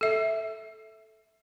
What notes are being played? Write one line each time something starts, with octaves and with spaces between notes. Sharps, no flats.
A4 E5